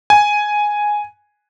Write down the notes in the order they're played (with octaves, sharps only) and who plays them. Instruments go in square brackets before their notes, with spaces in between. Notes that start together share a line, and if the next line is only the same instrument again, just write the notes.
[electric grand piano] G#5